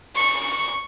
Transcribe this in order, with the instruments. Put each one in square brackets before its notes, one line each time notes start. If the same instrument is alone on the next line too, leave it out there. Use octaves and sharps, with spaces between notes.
[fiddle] C#6